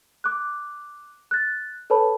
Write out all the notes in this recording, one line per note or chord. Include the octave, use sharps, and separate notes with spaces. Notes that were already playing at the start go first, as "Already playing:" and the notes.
D6 F#6
F#6 A6
A4 B4 C#5 A5 B5